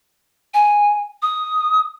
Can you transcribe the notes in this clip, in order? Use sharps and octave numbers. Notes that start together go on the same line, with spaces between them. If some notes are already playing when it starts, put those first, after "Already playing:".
G#5
D#6